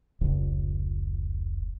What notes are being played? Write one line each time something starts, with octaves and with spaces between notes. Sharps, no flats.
F1 C#2